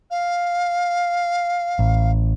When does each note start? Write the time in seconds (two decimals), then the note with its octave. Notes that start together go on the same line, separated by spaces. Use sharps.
0.11 F5
1.79 A1